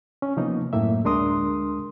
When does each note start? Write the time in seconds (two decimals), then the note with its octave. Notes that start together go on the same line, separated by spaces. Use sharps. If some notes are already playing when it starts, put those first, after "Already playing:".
0.22 C#4
0.37 C3 F3 A#3 B3 D#4
0.73 F#2 A2 A#3 E5
1.04 D2 G#3 D4 A#4 C6 D#6